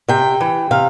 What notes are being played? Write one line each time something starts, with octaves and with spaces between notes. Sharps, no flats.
C3 G5
E3
C3 F5